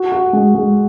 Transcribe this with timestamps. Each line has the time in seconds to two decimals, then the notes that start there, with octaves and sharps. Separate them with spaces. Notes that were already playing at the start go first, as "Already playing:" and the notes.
Already playing: F#4
0.12 F#4
0.33 G#3
0.55 G#3